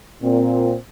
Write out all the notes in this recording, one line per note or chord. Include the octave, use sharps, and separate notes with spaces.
A#2 C4